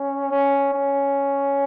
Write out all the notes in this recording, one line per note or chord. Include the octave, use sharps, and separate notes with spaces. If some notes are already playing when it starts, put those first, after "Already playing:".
Already playing: C#4
C#4
C#4